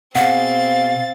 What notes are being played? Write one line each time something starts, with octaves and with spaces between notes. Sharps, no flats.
B2 C4 G#4 F5 F#5 A6